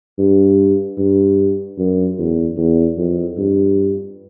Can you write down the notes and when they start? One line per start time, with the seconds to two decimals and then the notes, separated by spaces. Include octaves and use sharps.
0.18 G2
0.98 G2
1.78 F#2
2.18 E2
2.57 E2
2.98 F2
3.38 G2